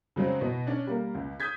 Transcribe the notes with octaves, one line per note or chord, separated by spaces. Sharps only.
C#3 F#3 G#3 C4
B2 E3
C#4 D4
G3 A#3 A#4
C#2
D#6 G6 G#6 B6